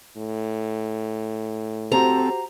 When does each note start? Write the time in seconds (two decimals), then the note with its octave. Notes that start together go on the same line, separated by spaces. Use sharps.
0.17 A2
1.92 C4 F#4 G4 A4 C5 A#5